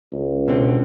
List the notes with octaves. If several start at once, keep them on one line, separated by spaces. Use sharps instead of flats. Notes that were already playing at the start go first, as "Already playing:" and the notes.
C#2
B2 D3 C4